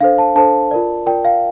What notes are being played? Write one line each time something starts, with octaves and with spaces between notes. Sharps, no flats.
D4 A4 C5 F5
A5
D4 A4 C5 A5
F4 A#4 D5
F4 A#4 D5 G5
F5